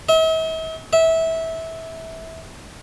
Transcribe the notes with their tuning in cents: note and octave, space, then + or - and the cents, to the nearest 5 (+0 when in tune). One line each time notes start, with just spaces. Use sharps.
E5 -45
E5 -20